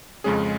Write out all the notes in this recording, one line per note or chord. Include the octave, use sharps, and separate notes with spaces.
F2 C#3 G#3 C#4 G#4